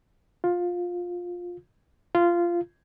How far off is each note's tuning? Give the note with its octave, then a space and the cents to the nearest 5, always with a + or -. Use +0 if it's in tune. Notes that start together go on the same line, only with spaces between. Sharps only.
F4 +15
F4 -15